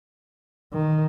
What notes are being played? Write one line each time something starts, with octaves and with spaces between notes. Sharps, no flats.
D#3